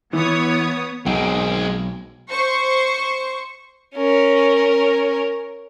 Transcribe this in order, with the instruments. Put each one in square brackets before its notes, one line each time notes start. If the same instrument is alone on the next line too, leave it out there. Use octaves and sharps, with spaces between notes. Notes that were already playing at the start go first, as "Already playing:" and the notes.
[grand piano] E3 [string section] B3 C#5 D#6
[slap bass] B1 [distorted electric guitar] G#3 C4
[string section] C5 C#6
[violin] C#4 A#4